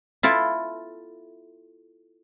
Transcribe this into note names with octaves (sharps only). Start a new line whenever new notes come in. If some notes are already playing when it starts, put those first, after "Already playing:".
E4 F4 A4